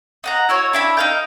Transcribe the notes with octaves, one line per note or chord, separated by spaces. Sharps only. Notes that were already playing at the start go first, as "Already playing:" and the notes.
D#4 F#5 A#5
E4 F#4 C#5
D4 E4 B5
D#4 F5 G5